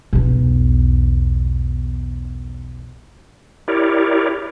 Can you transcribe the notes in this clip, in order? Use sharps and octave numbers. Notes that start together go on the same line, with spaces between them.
B1 E2
E4 G4 A#4 C#5 D5